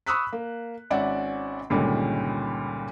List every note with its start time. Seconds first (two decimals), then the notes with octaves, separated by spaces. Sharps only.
0.06 B5 C#6 D#6 E6 F#6 B6
0.33 A#3
0.91 G#1 C#4 D5 E5 F#5
1.70 C#2 G2 A#2 D3 D#3 C#4